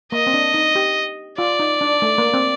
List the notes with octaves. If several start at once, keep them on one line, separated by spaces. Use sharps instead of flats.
A#3 D#5
C4
D4
D#4
G4
F4 D5
D#4
D4
A3
A#3
C4